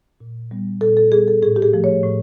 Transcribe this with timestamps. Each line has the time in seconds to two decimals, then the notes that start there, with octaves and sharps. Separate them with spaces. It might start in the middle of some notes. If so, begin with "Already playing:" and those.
0.20 A#2
0.51 G3 B3
0.81 A#2 A4
0.97 A4
1.12 G3 B3 G#4
1.28 A4
1.42 A2 G#4
1.56 G4
1.62 G#4
1.73 F3 A3
1.84 C#5
2.04 A2